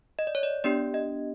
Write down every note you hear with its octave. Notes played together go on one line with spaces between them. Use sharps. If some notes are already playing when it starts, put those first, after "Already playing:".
D#5
D5
C#5
D5
B3 D4 G4 D5
D#5